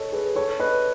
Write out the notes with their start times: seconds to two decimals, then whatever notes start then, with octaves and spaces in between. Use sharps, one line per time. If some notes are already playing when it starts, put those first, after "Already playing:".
Already playing: A4 C#5 D#5
0.12 G#4 B4
0.36 A4 C#5
0.60 B4 D#5